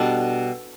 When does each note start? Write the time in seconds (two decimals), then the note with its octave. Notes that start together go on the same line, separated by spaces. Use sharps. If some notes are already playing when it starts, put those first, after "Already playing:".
Already playing: B2 G3 D4 A4